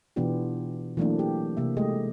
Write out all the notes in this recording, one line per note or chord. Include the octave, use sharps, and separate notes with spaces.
B2 E3 B3 D4 F4 G4
E3 F#3 A3 A#3 C4 D4
G4
C3 A#3 E5
G#3 A3 G4 D#5